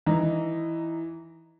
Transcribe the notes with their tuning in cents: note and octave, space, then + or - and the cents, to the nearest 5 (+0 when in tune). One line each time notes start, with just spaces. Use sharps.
E3 +0 D#4 -15 A#5 +0